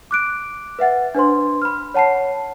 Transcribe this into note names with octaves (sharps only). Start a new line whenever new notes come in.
D6 F#6 D7
B4 E5 F#5 A6
D4 B4 C5 C6
B5 F6
C#5 F#5 A5 B5 C7